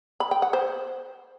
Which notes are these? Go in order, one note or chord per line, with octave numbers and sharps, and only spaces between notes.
B5
G5
F#5
C5